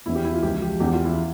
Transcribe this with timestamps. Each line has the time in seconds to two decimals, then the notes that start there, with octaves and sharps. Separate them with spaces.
0.06 E2 E3 E4
0.15 G4
0.25 E4
0.34 F4
0.43 C#2 C#3 F3 G4
0.62 G4
0.80 E2 E3 G4
0.92 F4
1.05 E4